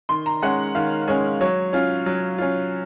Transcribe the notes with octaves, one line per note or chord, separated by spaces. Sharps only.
D#3 C6
A#5
G#3 C#4 F#5
D#3 F5
G#3 C#4 C#5
F#3 C#5
C#4 F4
F#3
C#4 F4